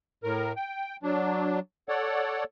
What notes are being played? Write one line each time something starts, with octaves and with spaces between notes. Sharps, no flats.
A2 A#4
G5
F#3 D4
A4 C#5 D5 F#5